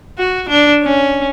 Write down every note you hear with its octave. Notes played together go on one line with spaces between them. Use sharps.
F#4
D4
C#4